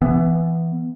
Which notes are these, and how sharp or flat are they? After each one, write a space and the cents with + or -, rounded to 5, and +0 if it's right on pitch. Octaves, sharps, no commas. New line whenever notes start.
E3 +15 B3 +0